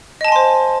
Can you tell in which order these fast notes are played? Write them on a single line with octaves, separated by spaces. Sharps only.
D#5 A5 G#5 C6 C5